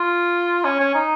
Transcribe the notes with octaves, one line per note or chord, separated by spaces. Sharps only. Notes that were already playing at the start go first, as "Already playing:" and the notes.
Already playing: F4
C#4
C#4
D#4